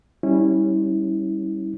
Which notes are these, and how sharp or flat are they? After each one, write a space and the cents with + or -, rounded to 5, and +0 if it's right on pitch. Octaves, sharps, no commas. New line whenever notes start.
G3 +0 C#4 -15 E4 -30